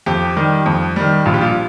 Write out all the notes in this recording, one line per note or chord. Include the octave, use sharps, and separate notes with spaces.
F2 G4
D#3 G3
F2
D#3 G3
A#1 F4
G4
F4